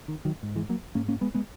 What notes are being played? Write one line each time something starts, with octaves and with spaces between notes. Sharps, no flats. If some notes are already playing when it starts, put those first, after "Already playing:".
D#3
D#3 F#3
G#2
E3 G#3
F#3 A#3
G#2 A#3 C#4
A#3 C#4
G#3 B3
G#3 B3